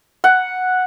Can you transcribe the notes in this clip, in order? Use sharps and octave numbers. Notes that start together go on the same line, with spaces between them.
F#5